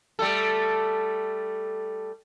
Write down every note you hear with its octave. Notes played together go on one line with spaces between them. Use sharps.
G3 A3 A4